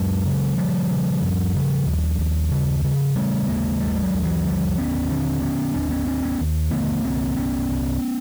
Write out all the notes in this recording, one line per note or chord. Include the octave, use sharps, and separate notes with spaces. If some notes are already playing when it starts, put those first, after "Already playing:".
Already playing: F#2 F#3 G#3
C#3
C#3 F3 G3
C#3
F#2
C#3
D#2
D#2
C#3
C#3
C#3 G3 A3
D#2 G#3 A#3
D#2 G3 A3
G3
F#3 G#3
D#2
E3 F#3
D3 F3 G3
D#2 B3 C#4
D3 C4 D4
D3 B3 C#4
D#2 C4 D4
B3 C#4
D#2 C4 D4
B3 C#4
D#2
D3 A3 B3
C2 A#3 C4
C2 B3 C#4
C2